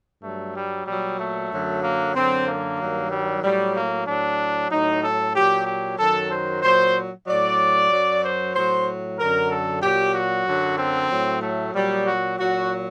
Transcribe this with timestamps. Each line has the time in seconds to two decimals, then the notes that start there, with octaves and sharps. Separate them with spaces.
0.23 G2 F#3 A3
0.56 G3
0.87 A#2 F#3 G3
1.19 A3
1.52 F#2 D3 F#3
1.84 A#3
2.15 F#2 D3 F#3 C4
2.48 A#3
2.79 G2 D#3 F#3
3.11 G3
3.43 A2 F#3 G3
3.75 A#3
4.07 A2 F#3 D4
4.71 A2 F#3 D#4
5.03 A4
5.35 A#2 F#3 G4
5.67 G4
5.99 F#2 D#3 F#3 A4
6.32 C5
6.63 A#2 F#3 C5
7.27 A2 F#3 D5
7.91 F#2 F#3
8.23 C5
8.55 A2 F#3 C5
9.19 F#2 D3 F#3 A#4
9.50 A4
9.82 A#2 F#3 G4
10.15 F#4
10.46 F#2 D3 F#3
10.79 C4
11.10 A2 F#3
11.42 A3
11.74 A#2 F#3 G3
12.07 F#4
12.38 A#2 F#3 F#4